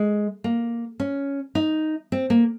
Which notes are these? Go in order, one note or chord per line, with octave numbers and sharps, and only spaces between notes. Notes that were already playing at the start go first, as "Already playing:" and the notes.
Already playing: G#3
A#3
C#4
D#4
C4
A#3